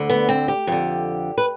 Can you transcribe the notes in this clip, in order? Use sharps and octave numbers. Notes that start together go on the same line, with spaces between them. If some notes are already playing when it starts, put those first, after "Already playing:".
Already playing: D2 D3
B3
C4
G4
F2 D3
B4